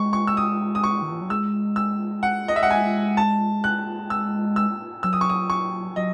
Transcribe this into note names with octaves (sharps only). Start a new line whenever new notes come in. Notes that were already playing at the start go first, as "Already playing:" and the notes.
Already playing: G#3 C#6
C#6
E6
D#6
D#6
C#6
D#3
E3
F#3
G#3 E6
E6
F#5
D#5
E5
F#5
G#5
A5
F#6
E6
E6
F#3 E6
D#6
C#6
D#6
C#6
F#3 D#5